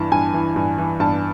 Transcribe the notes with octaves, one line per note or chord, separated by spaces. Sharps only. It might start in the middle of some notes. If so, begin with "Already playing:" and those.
Already playing: G2 E3 A5
G2 G#5
E3
G2
E3
G2 A5